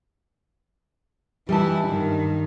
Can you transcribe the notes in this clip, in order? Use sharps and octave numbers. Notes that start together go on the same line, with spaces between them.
E3 G3 E4 D#5 A5
G2 D#3